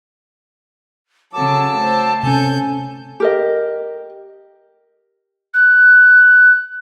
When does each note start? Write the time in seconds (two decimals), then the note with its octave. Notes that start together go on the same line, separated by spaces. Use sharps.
1.33 C#3 F#3 A4 A5 D6 E6
1.76 A3 C5
2.23 C3 C#4 A4 G#5 G6
3.20 G4 A#4 D#5
5.54 F#6